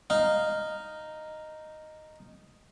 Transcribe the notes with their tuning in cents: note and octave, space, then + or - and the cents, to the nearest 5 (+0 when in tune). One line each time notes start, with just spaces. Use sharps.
D#4 -5 F5 +0